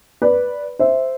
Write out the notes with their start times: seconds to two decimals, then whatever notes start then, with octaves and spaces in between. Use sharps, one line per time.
0.22 B4 D5
0.79 C5 E5